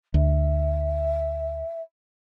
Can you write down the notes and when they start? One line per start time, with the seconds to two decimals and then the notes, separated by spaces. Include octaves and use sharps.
0.14 D2 E5